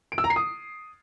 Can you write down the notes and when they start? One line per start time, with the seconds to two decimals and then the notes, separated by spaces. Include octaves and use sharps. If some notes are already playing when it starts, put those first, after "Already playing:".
0.12 D7
0.18 E6
0.24 A#5
0.30 C7
0.36 D#6